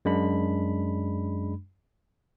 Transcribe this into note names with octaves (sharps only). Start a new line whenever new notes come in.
F#2 G#3 D4 B5